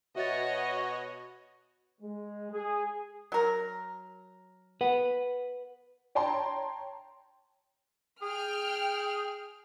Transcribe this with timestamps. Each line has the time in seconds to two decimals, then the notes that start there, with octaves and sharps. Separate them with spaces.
0.16 B2 F#4 C#5 D#5 E5 A6
2.01 G#3
2.51 G#4
3.32 F#3 A#4
4.81 B4 F#5
6.15 C#5 G5 A5 A#5 C6
8.22 G#4 G5 F6